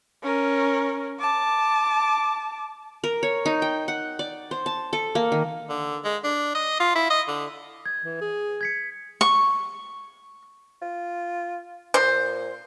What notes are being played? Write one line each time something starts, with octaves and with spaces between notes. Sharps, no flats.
C#4 A#4
A5 D6
A#4
C#5
D#4
G5
F#5
D5
C5
A5
A4
A#3
D#3
D3
G#3
D4
D#5
F4
E4
D#5
D3
G#6
E3
G#4
G#6 B6 C#7
C#6
F4
A#2 C5